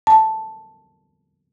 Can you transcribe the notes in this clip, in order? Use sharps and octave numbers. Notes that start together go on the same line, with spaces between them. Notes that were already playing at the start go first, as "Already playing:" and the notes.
A5